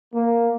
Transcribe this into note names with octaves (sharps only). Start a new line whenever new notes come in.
A#3